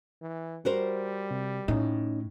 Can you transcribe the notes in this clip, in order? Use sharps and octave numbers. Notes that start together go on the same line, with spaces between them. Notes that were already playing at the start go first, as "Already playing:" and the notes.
E3
G3 F#4 A#4 C5
C3
A2 C#4 D#4